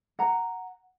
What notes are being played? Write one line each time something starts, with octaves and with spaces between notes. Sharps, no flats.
F#5 A#5